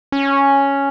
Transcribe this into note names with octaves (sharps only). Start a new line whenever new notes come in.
C#4